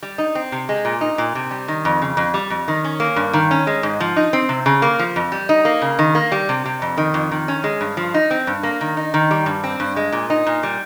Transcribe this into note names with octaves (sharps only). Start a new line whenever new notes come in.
G3
D#4
C4
C3
G#3
A#2
D#4
A#2
C3
G3
D#3
F2
C#3
F2
G3
F2
D#3
C#4
A#3
G2
D#3
C#4
G#3
G#2
F3
D#4
C4
C3
C#3
A#3
F3
F2
G3
D#4
A#3
C#3
D#3
A#3
G3
C3
C3
F2
D#3
F2
D#3
C#4
G#3
G2
F3
D#4
C4
G2
A#3
D#3
D#4
D#3
G3
G2
C4
G2
G#3
A#2
D#4
A#2
G3